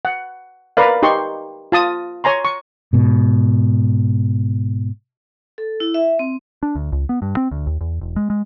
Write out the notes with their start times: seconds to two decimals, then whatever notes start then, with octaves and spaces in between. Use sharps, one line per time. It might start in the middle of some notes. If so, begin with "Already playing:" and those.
0.05 F#5
0.77 A#4 B4 D5 F5
1.02 D#4 G4 C6 C#6
1.72 F4 A5 D#6
2.24 C#5 G#5 A#5 C6
2.45 C#6
2.93 G#2 B2
5.58 A4
5.80 E4
5.94 E5
6.19 C4
6.63 D4
6.75 D2
6.92 C#2
7.09 B3
7.22 G2
7.37 C4
7.51 D2
7.67 D#2
7.81 E2
8.01 E1
8.16 G#3
8.30 G#3